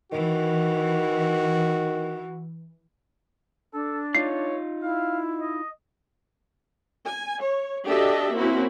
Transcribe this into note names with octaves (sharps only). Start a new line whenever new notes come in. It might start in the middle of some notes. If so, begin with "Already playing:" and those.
D#3 E3 F#4
D4 A4
D#4 F4 C#5 C7
E4 F5
D#5
G#5
C#5
D4 F#4 G4 A4 D#5 E5
A#3 C4 C#4 E4 F#4